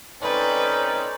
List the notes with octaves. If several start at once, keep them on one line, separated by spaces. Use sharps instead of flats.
C4 C#4 D#4 A4 B4 D5